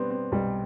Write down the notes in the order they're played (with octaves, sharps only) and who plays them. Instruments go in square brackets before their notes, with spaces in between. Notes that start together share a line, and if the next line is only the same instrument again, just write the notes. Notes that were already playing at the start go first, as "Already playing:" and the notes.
Already playing: [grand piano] B2 G3 C4 [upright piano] B3 D4
[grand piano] C4
[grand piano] B1 [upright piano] G3